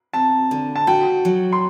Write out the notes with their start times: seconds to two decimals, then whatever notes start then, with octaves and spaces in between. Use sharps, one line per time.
0.13 C4 A5
0.51 D3
0.76 A5
0.87 F#4 G5
1.25 F#3
1.53 C6